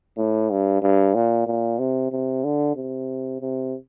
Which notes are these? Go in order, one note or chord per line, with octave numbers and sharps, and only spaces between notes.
A2
G2
G2
A#2
A#2
C3
C3
D3
C3
C3